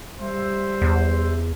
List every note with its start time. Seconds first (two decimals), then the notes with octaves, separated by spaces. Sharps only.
0.20 G3 C5 E5
0.82 E2